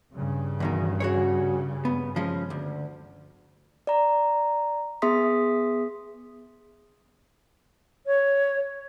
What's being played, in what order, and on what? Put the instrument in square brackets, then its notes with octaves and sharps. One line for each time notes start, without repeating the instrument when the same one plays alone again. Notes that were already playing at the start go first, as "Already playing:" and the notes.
[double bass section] G2 C#3
[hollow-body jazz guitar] E2 B2 D#3
F#4 G#4 C#5
B3
F3 G#3 C#4
D2
[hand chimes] D5 A#5
B3 G#4 E5 C6 D#6 B6
[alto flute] C#5